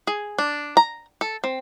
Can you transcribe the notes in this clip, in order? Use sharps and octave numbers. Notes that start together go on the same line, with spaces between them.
G#4
D4
A#5
A4
C4